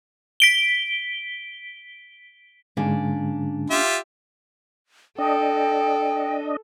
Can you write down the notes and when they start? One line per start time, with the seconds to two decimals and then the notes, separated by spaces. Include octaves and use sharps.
0.40 B6 D7 G7
2.77 G#2 D3 G#3 A#3 C#4 D4
3.70 F4 G4 E5
5.19 D4 A4 D#5 G5